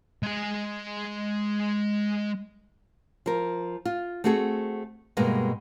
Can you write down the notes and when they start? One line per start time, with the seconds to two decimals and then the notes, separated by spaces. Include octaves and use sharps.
0.23 G#3 G#5
3.26 F3 A#4
3.85 F4
4.24 A3 C4 F#4 G#4 A4
5.17 G2 B2 G#3 A#3